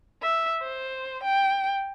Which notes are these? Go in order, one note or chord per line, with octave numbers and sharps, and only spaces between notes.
E5
C5
G5